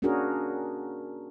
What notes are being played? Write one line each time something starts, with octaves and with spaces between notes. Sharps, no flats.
A#3 C#4 D4 F#4 G#4 A#4